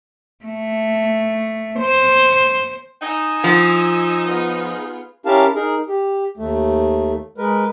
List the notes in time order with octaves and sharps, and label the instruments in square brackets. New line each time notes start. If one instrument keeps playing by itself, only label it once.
[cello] A3
C5
[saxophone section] D#4 [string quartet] G#5 E6
[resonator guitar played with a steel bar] F3
[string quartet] B3 F4 G#4
[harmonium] C#4 E4 G4 A#4 F5 A5
D#4 G#4 A#4
G4
D#2 A3
G#3 A#4 B4